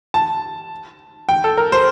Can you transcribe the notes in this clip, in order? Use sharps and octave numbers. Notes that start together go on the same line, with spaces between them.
A5
G5
A4
A#4
C5